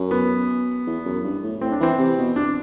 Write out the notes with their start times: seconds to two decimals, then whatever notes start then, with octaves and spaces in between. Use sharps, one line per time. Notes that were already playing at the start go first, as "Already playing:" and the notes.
Already playing: F#2
0.11 B3
0.86 E2
1.05 F#2
1.24 G2
1.43 A2
1.61 A2 C4
1.72 D4
1.80 E3 C4
1.99 C3
2.18 B2
2.36 D4